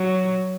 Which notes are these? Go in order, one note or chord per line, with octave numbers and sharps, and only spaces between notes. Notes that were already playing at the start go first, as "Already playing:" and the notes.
Already playing: F#3